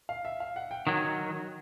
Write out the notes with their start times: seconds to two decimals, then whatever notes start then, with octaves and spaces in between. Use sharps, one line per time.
0.09 F5
0.25 E5
0.40 F5
0.56 F#5
0.71 G5
0.87 D#3 F#3 F#5